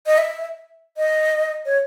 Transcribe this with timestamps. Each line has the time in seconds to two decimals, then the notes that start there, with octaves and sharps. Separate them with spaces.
0.06 D#5
0.18 E5
0.97 D#5
1.66 C#5